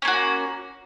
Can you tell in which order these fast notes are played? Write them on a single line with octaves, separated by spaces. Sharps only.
C#4 A#3 F#4